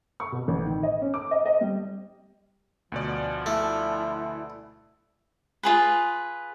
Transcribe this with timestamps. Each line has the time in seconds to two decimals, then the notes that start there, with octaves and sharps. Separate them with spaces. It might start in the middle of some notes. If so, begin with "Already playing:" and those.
0.20 C#6
0.32 B2
0.48 A1
0.65 D#3
0.83 D#5
1.01 C#4
1.14 D6
1.31 D#5
1.46 D#5
1.61 G3
2.92 D2 B2 F3 D5
3.46 A3 E4
5.63 F4 G#4 B4